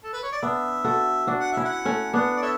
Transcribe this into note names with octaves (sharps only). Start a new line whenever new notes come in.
A4
B4
C#5
D5
B3 D4 E5
F#4 A4
D4 F#4
F#5
C#4 E4 E5
F#5
A3 C#4
B3 D4 F#5
D5
A4 C#5 E5